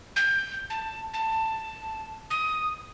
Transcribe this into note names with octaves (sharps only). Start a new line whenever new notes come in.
G6
A5
A5
D#6